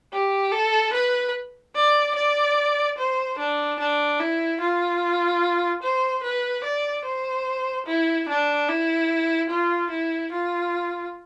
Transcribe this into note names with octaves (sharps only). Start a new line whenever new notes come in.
G4
A4
B4
D5
D5
C5
D4
D4
E4
F4
C5
B4
D5
C5
E4
D4
E4
F4
E4
F4